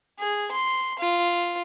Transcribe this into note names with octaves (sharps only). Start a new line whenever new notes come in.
G#4
C6
F4